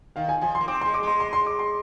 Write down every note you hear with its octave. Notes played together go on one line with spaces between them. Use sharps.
D#3 F5
G#5
F3 G#5
C6
A#3
C4 D6
C6
G#3
D6
G#3 C6
C6
C6
D6
C6